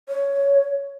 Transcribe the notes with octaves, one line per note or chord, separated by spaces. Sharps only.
C#5